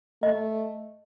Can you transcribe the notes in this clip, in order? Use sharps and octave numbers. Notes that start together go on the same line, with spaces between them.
A3 D#5